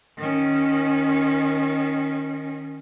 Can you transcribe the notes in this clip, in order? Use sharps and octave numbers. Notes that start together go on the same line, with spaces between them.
D#3 C#4